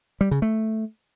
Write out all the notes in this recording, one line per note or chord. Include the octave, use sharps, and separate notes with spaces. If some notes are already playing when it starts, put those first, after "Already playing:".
G3
C#3
A3